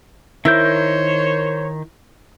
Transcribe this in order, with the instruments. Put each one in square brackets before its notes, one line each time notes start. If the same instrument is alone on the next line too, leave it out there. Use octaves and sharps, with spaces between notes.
[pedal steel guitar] D#3 A#4 G6 [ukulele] E4 [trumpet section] C5 C#5